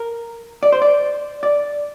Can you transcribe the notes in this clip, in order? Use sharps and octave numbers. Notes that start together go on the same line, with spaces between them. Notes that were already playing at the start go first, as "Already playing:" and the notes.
Already playing: A#4
D5
C5
D5
D5